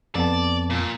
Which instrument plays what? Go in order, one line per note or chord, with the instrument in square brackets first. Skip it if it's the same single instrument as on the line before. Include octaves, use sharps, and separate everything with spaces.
[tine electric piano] F2 B3 A5 [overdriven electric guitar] D5
[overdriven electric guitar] A#2